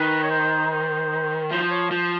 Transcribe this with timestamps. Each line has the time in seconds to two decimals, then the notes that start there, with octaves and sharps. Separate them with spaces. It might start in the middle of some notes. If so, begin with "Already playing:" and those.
Already playing: D#3 B4
0.23 C#5
0.31 C5
0.71 C5
1.51 F3 C5
1.71 C#5
1.91 F3 C5